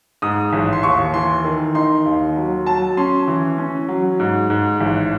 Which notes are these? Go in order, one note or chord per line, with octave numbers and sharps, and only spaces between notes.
G#2 D#6
A1
C6
D#2 C#6
E3 C6
D#3
D#4 C6
D#2
F#3
F#3 A5
C#4 C6
E3
C#4
F#3
G#2
G#2
A1